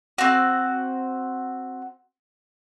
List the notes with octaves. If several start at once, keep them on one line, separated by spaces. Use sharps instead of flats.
C4 F#4